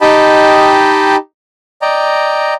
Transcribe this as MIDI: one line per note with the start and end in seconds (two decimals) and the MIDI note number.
0.01 1.16 63
0.01 1.16 67
0.01 1.16 75
0.01 1.16 79
0.01 1.16 81
0.01 1.16 83
1.82 2.54 74
1.82 2.54 75
1.82 2.54 79
1.82 2.54 82